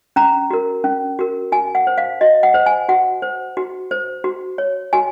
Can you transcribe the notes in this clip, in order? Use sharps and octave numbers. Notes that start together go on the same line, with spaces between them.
C#4 A#5
F#4 A#4
C#4
F#4 A#4
F#4 G#5
F#5
C5
F5
F#4 D#5
F#5
C5
G#5
F#4 F#5
C5
F#4
C5
F#4
C#5
F#4 G#5